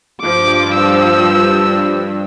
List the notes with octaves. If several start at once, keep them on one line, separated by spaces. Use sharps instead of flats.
G2 F3 D6
E6